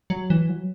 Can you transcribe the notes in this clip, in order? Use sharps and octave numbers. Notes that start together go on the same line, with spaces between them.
F#3
E3
F#3